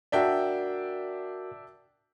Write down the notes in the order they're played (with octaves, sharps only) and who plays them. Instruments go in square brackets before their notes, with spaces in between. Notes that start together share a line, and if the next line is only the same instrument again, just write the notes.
[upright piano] D4 E5 G5 [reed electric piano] F#4 A#4 D5